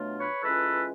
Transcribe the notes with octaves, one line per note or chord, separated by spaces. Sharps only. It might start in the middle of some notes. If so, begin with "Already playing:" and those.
Already playing: B2 F#3 A3 D4 F4
B4 C#5
E3 G#3 C#4 F4 A4 B4